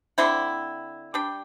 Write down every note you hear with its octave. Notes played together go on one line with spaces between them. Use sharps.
D3 C4 E4 G5
G3 D4 G5